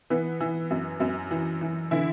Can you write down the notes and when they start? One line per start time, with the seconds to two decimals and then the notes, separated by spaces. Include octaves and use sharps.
0.10 E3 B3
0.40 E3
0.71 F#2
1.00 F#2
1.31 E3
1.61 E3
1.91 D3 E3 E4